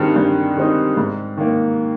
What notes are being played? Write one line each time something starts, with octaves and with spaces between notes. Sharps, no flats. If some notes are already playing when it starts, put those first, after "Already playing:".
Already playing: G2 D#3 G#3 C4 D#4
G2
D#3 G#3 C4 D#4
G#2
D#3 A#3